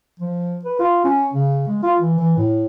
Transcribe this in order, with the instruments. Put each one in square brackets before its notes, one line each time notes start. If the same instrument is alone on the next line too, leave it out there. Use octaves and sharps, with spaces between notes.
[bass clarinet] F3
B4
F4
C#4
C#3
G#3
F4
E3
E3
A2